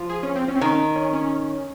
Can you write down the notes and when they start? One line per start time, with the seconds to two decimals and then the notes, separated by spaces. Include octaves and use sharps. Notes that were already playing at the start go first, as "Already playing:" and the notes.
Already playing: F3
0.10 G#4
0.23 C#4
0.36 C4
0.48 C#4
0.56 C4
0.61 D#3 C#4
0.96 C#4
1.13 C#4